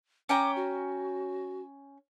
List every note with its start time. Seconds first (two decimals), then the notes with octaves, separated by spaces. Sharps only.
0.29 C#4 G5 A#5 D6
0.56 F#4